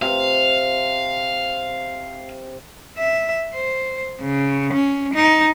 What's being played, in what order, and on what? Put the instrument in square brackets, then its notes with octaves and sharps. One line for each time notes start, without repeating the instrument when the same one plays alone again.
[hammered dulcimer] C3 [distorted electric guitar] F5
[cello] E5
C5
C#3
C#4
D#4